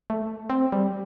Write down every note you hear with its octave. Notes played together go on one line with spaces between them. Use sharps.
A3
C4
G3